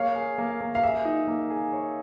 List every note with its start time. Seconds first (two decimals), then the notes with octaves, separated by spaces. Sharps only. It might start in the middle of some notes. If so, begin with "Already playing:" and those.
Already playing: A#3 G#4 C#5 F5
0.15 G#4
0.38 A#3
0.61 A#3
0.75 F5
0.83 G#4 E5
1.05 D#4
1.27 A#3
1.50 G#4
1.72 C#5